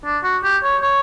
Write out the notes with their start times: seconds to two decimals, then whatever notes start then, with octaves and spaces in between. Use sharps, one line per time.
0.05 D4
0.23 F#4
0.44 G4
0.63 C#5
0.82 C#5